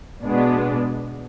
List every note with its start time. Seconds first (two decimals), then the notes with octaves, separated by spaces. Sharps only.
0.23 B2 G#3 B3 D4